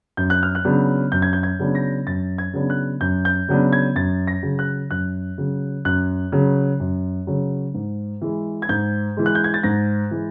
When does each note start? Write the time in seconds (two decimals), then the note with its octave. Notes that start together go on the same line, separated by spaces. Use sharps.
0.17 F#2 G6
0.30 F#6
0.43 F6
0.55 F#6
0.65 C#3 F#3 B3 D4
1.12 F#2 G6
1.22 G#6
1.33 G6
1.43 G#6
1.59 C#3 F#3 B3 D4
1.75 A#6
2.07 F#2 A6
2.38 G#6
2.54 C#3 F#3 B3 D4
2.70 F#6
3.01 F#2 G6
3.25 G6
3.48 C#3 F#3 B3 D4
3.73 G#6
3.96 F#2 A6
4.27 A#6
4.43 C#3 F#3
4.59 F#6
4.91 F#2 F#6
5.38 C#3 F#3
5.85 F#2 F#6
6.32 C#3 F#3
6.80 F#2
7.27 C#3 F#3
7.74 G#2
8.22 E3 G#3
8.62 G#6
8.69 G#2 G6
9.17 E3 G#3
9.26 F#6
9.35 G6
9.44 G#6
9.54 A6
9.63 G#2 A#6
10.11 E3 G#3